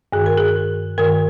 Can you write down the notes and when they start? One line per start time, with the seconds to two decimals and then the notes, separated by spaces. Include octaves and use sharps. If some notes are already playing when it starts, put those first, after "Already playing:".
0.12 G2 D#3 G#4
0.26 A#4
0.38 G#4
0.97 G2 D#3 A#4